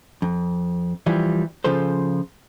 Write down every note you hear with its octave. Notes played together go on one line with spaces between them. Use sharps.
F2
E3 F3 G3
C#3 F3 F4 A4 C5